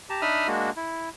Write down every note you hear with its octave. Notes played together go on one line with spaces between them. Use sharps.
G4 A5 A#5
D4 D#4 E5 B5 D#6 F6
G#3 A#3 D4 F#4
E4